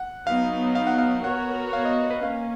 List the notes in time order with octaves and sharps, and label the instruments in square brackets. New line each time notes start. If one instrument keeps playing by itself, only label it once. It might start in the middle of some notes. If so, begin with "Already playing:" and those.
Already playing: [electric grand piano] F#5
[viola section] F#3 B3 D#4 [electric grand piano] F5
[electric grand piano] F5
F#5
F5
[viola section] B3 F#4 A#4 C#5 [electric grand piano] F#5
[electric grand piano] F5
D#5
B4
[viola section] A#3 C#4 [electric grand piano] F5